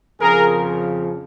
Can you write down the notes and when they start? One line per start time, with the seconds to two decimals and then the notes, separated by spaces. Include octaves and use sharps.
0.20 F2 C#3 F3 G#4 A#4